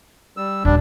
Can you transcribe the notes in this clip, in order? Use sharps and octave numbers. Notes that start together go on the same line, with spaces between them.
G3 E6
D#1 G3 D4